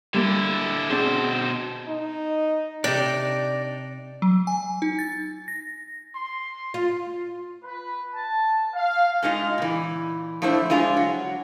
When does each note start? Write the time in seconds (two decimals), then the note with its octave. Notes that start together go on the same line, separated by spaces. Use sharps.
0.14 D3 G3 A#3 E4
0.90 B2 C4 D4 G#4 C5
1.88 D#4
2.84 C3 D4 D#4 D5 G5
4.22 F#3
4.47 G#5
4.82 D#4
4.99 A6
5.48 A#6
6.15 C6
6.74 F4
7.63 B4
8.15 A5
8.75 F5
9.22 G#2 G#3 D#4 F4
9.58 A#2 E3
10.42 F3 A3 D4 E4 C5
10.70 G#3 D4 F4 G#4
10.97 F#3